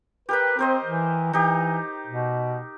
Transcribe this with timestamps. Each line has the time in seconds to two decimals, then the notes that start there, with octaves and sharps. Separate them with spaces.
0.29 G4 A#4 B4 G5
0.59 C4 A#4 C5 D#5
0.84 E3
1.33 E3 D#4 G4
2.07 B2